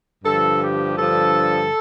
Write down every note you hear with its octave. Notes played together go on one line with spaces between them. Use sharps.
G2 D3 F3 A4
G4
G2 D3 F3 A4